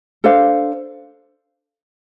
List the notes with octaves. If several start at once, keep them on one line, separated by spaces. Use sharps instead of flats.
D4 A4 C5 F5